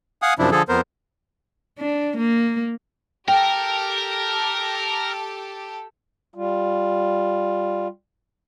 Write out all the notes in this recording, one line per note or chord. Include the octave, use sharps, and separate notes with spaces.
F5 F#5 G#5 D#6
F#2 C3 F3 D4 E4
D3 F3 G#4 A4
F2 B3 A#4 C5
D4
A#3
G4 A4 A#4 G5
G3 F4